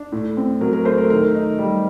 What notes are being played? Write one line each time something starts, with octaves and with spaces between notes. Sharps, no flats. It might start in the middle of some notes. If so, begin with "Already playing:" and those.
Already playing: D4
A2
C4
F#3 A#4
A#4
A3 C5
A#4
D#3 A#4
D#4
G3